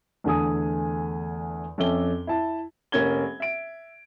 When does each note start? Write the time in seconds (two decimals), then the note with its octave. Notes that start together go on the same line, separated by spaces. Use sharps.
0.24 E2 D3 A3 G#5 D#6
1.78 F2 C#4 A4 E5 D6 G7
2.27 E4 A5
2.92 F1 A#3 C#4 G#6 G7
3.40 E5 D7